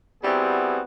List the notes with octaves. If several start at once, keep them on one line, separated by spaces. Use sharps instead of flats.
G3 B3 C4 E4 F#4 G#4